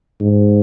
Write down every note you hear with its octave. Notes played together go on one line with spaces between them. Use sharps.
G#2